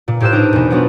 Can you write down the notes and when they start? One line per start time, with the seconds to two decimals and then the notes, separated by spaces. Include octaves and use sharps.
0.08 A#2
0.20 A2 G4 C5 E6 F#6 E7
0.32 D4 D#4 A#4
0.53 E2 B2
0.70 F#3 B3 D4 F4 F#4